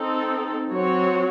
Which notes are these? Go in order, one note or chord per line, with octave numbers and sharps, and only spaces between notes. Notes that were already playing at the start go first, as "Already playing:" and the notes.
Already playing: C4 D#4 A4
F#3 C4 F#4 C#5